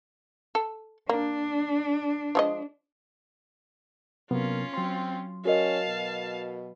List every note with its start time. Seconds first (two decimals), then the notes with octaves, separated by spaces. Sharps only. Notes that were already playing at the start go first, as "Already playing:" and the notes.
0.55 A4
1.09 A#3 D4
2.35 F3 G#3 D#5
4.31 C3 F#3 A#3 B3 C#4 F4
4.74 F#3 C4 C6
5.45 C#4 F#4 A#4 D#5 F5 A5
5.88 B2